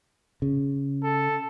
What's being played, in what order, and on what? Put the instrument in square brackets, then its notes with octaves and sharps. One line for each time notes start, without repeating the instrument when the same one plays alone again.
[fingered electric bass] C#3
[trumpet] A4